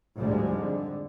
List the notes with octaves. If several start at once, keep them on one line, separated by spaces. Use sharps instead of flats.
D2 G#2 D3 F3 G3 G#3
F2 D3